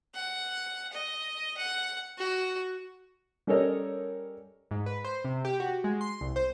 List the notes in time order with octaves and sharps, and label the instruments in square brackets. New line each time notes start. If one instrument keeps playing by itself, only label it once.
[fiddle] F#5
D#5
F#5
F#4
[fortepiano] G3 C#4 A4 A#4 C#5 D#5
[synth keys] G#2
B4
C5
C3
G4
F#4
G#3
C6
C2
C5